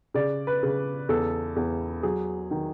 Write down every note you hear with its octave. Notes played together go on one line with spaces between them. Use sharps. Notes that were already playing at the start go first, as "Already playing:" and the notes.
C#3 D5
B4
C#3
E2 A4
E2
F#3 G#4
D#3